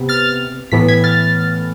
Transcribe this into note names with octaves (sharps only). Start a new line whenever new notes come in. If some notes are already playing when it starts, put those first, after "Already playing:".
Already playing: C3 B3
F6 A6
A2 E3 B3 B6
G#6 B6
F6 A6